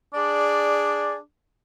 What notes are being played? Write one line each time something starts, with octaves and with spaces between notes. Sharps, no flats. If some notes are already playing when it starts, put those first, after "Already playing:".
D4 G#4 D5